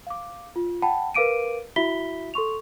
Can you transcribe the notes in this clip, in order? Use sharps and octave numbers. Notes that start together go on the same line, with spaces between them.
F5 D6
F4
F#5 G5 A5 B5
A#4 B4 F5 D6 D7 D#7
E4 F#4 E5 B5 B6 G7
A4 C6 C#6 F7